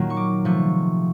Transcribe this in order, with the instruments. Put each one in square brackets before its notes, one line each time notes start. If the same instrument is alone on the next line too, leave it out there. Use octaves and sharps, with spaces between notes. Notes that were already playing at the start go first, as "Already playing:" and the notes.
Already playing: [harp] A#2 D#3 F#3 A#3
C#6
D6
C3 F3 A3 C#6